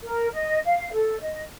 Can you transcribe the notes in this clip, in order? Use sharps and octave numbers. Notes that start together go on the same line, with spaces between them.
A#4
D#5
F5
A4
D#5